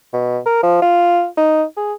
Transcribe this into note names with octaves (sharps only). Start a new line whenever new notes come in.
B2
A#4
F3
F4
D#4
G#4